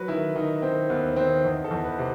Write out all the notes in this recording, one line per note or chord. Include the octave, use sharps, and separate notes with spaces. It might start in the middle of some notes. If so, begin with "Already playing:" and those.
Already playing: F#3 B4
D#3 E4
D#3 D#4
D#3 C4
D#2 B3
D#3 C4
E2 D#4
A4
E2
B4
C3